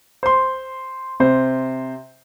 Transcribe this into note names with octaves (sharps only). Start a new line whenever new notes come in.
C5 C6
C3 C5